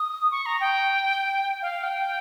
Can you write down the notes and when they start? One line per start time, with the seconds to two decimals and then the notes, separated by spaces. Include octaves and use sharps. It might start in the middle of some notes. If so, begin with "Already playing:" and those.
Already playing: D#6
0.31 C#6
0.46 A#5
0.60 G5
1.62 F5
1.83 G5